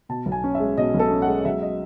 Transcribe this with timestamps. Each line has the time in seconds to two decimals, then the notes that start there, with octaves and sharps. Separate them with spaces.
0.09 B2 A5
0.26 B1
0.32 G#5
0.44 C#4
0.55 E5
0.60 G#3
0.77 B2 D#5
0.94 B1
0.99 A4
1.11 C#4
1.22 F#5
1.27 G#3
1.45 F#3 E5
1.62 D#5